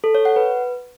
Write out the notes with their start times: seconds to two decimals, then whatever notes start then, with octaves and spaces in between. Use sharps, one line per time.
0.04 A4
0.15 C#5
0.25 F#5
0.36 B4